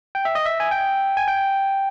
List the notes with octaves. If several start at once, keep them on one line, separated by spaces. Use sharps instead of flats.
G5
E5
D#5
E5
G#5
G5
G#5
G5